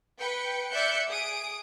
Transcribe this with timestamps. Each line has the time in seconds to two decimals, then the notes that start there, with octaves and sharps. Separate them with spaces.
0.19 B4 G5 C#7
0.71 D5 E5 F#6 G6 C#7
1.07 G#4 D#6 D7